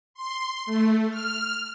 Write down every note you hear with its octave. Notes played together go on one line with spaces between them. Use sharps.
C6
A3
F6